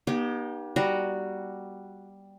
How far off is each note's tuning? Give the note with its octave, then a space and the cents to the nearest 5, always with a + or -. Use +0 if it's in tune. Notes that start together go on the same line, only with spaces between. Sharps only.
B3 -45 D#4 -20 G4 +0
G3 +0 F#4 +0 A#5 +0